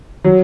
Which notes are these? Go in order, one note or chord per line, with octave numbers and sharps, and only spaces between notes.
F#3